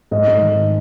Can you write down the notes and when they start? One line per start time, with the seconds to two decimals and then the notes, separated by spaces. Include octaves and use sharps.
0.11 G#2 D#5
0.27 G#2
0.42 D#3